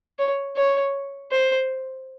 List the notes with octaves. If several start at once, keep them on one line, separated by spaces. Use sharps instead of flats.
C#5
C#5
C5